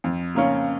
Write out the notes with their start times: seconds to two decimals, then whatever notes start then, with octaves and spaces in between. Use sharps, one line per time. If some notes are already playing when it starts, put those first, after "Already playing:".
0.04 F2
0.35 C#3 A#3 C#4